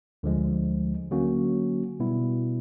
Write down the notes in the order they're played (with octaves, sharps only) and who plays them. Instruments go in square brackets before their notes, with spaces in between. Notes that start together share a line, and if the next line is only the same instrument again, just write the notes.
[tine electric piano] D2 D3 F3 G#3
D3 F#3 A#3 C#4 F#4
B2 G3 B3 E4